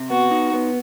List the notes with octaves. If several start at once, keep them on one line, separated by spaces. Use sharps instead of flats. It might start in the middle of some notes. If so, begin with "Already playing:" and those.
Already playing: C3
B3 F#4
D#4
B3